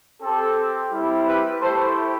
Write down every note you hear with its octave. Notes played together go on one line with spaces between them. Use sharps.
C4 G4 A4
G3 C4 E4
G4 B4
A3 E4 G4 A4 C5